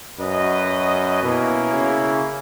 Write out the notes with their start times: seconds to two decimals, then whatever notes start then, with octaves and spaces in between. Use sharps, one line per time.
0.20 F#2 F#4 B4 D#5
1.23 B2 A#3 C#4 E4
1.75 C#3